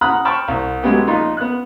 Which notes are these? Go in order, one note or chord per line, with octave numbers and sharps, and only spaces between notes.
F#5 A#5 B5 D#6 F6 F#6
G5 A5 B5 C#6 F6
C2
F#3 G#3 A3 B3 G4
A#1 D#4 F4
B3 F#6